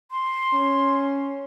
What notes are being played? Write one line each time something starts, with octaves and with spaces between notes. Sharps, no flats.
C6
C#4